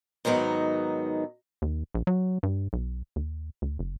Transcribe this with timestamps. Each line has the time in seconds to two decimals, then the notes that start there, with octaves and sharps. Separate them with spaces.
0.25 G#2 D#3 F#3 B3 D#4
1.62 D#2
1.95 A#1
2.07 F#3
2.43 G2
2.73 B1
3.16 D#2
3.62 D2
3.79 F#1